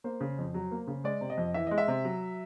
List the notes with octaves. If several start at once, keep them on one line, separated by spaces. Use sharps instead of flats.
A#3 C5
C#3
F2
F#3
A#3
C#3
G#3 D5
C3
D#5
F2
E3 E5
G#3 D#5
E5
C3
F#3